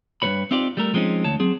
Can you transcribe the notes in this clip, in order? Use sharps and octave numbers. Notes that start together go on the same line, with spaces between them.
G2 F#3 B4 C#5 B5
C4 D#4 F4 G4 D5
G3 A3 A#4
F3 G#3 C4 C#4 D#4
D2 C#5 A5
F#3 C4 G#4